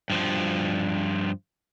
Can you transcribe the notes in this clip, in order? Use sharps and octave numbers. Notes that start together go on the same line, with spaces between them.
G2 F3